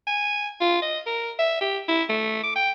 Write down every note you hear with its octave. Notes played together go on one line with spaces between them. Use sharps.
G#5
F4
D#5
A#4
E5
G4
E4
A3
D6
G5